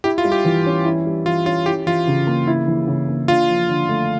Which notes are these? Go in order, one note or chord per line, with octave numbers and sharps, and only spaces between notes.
E4 G4
F4
G3
G4
E3
C#4
E4
G3
E3 F4
C#4 F4
E4 G4
E3 F4
C#3
A#3
E4
E3
C#3
A#3
D4 F4
F3
D3
A3